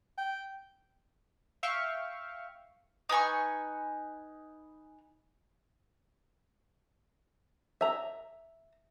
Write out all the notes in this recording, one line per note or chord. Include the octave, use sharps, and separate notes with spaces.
G5
E5 F5 G5 C#6
D#4 B4 G#5 C#6
E5 A#5